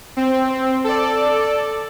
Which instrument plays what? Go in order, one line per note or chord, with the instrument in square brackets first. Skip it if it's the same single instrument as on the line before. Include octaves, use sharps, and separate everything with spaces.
[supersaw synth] C4
A4 D5